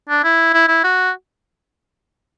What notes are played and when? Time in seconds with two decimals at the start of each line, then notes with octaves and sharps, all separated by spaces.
0.09 D4
0.24 E4
0.54 E4
0.68 E4
0.84 F#4